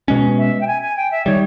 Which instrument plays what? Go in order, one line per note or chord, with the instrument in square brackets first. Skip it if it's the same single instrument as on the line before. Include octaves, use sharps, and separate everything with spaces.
[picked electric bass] B2 G#3 C#4
[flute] E5
G5
G#5
G#5
G5
E5
[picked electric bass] D#3 G3 [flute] C#5